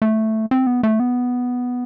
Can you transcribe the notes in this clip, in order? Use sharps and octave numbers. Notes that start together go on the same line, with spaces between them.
A3
C4
B3
A3
B3